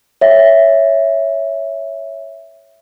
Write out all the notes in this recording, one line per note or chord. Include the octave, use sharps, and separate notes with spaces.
C#5 E5